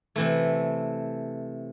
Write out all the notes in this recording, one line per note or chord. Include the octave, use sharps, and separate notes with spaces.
C3 E3 A3